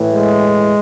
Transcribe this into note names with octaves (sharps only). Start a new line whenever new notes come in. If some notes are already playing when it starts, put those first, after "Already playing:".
Already playing: A2 E3
G#3